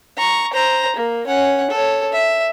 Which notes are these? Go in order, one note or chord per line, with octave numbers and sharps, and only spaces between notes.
A#5 C#6
C5 A#5
A#3
C#4 F#5
A4 C#5
E5